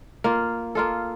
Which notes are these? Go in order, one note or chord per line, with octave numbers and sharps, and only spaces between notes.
A#3 F4
A#3 F4 A4